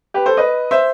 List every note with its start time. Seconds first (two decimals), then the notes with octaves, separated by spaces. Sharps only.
0.14 G4 B4
0.26 A4 C5
0.37 B4 D#5
0.71 C5 E5